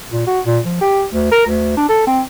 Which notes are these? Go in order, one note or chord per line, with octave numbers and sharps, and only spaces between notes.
A#2
F#4
A#2
F3
G4
D2
A#4
D2
D4
A4
C4